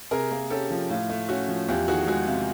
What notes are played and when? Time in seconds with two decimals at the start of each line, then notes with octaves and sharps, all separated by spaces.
0.11 C3 G#4 A#4
0.31 A#3
0.50 C#4 G4 A4
0.70 F3
0.90 A2 F4
1.09 A3
1.29 C#4 F#4
1.48 F3
1.68 E2 F4 G4
1.88 D#3 F#4 G#4
2.08 G#3 F#4
2.27 C3 F4